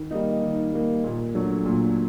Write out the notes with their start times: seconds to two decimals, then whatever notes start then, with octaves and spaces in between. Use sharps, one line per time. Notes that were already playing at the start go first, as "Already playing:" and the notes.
Already playing: D#3
0.11 G3 A#3 D#4
0.42 D#3
0.72 G3 A#3 D#4
1.04 A#2
1.35 F#3 A3 D4
1.65 A#2